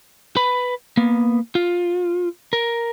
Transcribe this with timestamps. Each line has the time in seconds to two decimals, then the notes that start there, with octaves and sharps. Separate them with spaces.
0.37 B4 B5
0.97 A#3 B3
1.55 F4
2.53 A#4